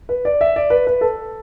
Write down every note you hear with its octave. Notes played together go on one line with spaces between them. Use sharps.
B4
D5
E5
D5
B4
B4
A4